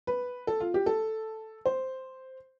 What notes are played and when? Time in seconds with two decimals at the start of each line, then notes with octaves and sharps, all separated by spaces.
0.07 B4
0.47 A4
0.60 F4
0.74 G4
0.86 A4
1.66 C5